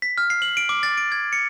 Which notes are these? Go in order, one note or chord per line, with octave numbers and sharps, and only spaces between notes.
B6
F6
C7
F#7
D7
D6
A6
D7
G#6
C#7